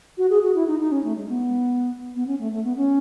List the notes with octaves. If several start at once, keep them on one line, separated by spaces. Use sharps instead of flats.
F#4
G#4
F#4
E4
D#4
D#4
C#4
A3
G#3
B3
B3
C#4
A3
A3
B3
C#4